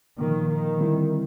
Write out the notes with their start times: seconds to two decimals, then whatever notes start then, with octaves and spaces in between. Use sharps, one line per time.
0.18 A#2 D#3 F3 A#3
0.48 D#3
0.78 D3 G3 C4 E4